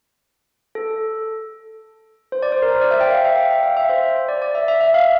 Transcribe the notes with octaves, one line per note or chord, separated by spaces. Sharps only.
A4
C5
D5
C5
A#4
C5
D5
E5
G5
F5
E5
G5
G5
F5
E5
C5
D5
D5
E5
E5
E5
F5